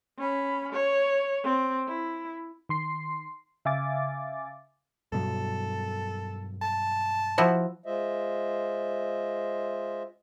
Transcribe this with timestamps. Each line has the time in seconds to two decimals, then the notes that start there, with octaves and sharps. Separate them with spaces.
0.18 C#4 B5
0.73 C#5
1.44 C4
1.88 E4
2.69 D#3 C6 C7
3.65 C#3 E5 F5 G#5 D6 A6
5.12 G2 B2 F#3 A4
6.62 A5
7.38 F3 E4 F#4
7.86 G#3 F4 C5 D#5 E5